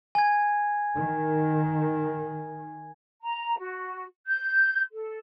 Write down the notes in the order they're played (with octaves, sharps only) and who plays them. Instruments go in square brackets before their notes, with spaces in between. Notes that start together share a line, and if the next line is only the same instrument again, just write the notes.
[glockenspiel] G#5 G#6
[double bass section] D#3
[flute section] A#5
F#4
G6
A4